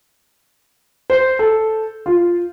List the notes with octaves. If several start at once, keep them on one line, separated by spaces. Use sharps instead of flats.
C5
A4
F4